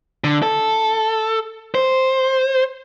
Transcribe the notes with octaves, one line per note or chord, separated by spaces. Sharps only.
D3
A4
C5